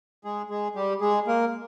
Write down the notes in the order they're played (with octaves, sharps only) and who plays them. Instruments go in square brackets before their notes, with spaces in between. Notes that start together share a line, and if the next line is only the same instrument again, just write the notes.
[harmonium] G#3 G#4
G#3 G#4
G3 G4
G#3 G#4
A#3 A#4